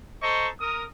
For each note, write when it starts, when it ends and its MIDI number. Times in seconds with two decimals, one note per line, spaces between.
0.22 0.48 69
0.22 0.48 72
0.22 0.48 75
0.22 0.48 82
0.22 0.48 85
0.61 0.84 70
0.61 0.84 87